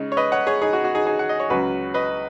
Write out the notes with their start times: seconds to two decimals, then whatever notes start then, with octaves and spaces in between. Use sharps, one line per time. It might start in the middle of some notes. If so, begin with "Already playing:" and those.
Already playing: C#3 G#3 D#4
0.12 C#5
0.17 B4 D#5
0.32 C#5 F#5
0.47 G#4 C#5
0.62 D#4 G#4
0.73 F#4
0.84 F#4
0.95 D#4 G#4
1.06 D#4 G#4
1.19 F#5
1.29 D#5
1.40 C#5
1.50 C#2 C#3 F#3 F#4 B4
1.94 B4 D#5